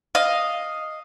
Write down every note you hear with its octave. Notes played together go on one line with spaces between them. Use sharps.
D#5 F5